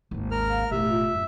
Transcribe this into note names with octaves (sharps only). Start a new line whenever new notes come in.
G#1 D#2
A#4 F6
F5
E1 A2 G4 E5
F4
F#2